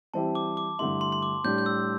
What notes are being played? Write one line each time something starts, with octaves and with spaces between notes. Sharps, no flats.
E3 G3 C4 E4 G4 A5
D6
D6
G2 D3 A3 E4 C6
C6
C6
D6
A2 G3 D4 G6
G6
E6